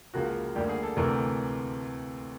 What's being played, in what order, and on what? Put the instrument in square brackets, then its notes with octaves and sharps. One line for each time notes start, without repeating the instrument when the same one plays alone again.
[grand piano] C#2 C#3 F3 A#3 F#4
D2 D3 G3 A#3 G4
G#4
A4
D2 C3 E3 A3 A#4